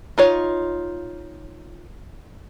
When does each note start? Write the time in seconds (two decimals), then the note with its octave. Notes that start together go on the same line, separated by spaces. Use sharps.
0.18 D#4 F4 C#5